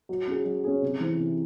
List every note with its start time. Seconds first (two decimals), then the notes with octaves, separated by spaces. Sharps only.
0.09 F#3
0.27 C#4 G#4
0.45 F#3
0.64 C#4 G#4
0.82 C3
1.00 E3 C4
1.19 C3